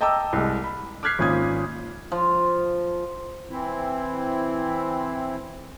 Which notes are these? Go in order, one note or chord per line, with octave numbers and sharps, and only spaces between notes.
D#5 G5 A5 A#5 D6 E6
C2 G#3
B5
D6 F6 F#6 G#6 B6 C7
G#1 A#2 C#4 D#6 G#6
F3
E3 C4 E4